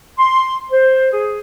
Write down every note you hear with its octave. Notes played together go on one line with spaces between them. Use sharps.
C6
C5
G#4